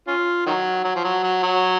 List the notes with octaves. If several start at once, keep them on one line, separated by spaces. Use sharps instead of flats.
C#4 F4
D#3 F#3
F#3
F3
F#3
F#3
F#3